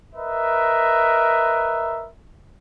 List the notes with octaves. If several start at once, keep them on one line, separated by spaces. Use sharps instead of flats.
A#4 B4 D#5 E5